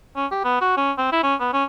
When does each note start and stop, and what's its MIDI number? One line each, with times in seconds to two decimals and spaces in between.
0.16 0.26 61
0.32 0.42 67
0.45 0.59 59
0.61 0.76 66
0.77 0.92 61
0.98 1.07 60
1.12 1.19 64
1.23 1.35 61
1.40 1.50 59
1.53 1.64 61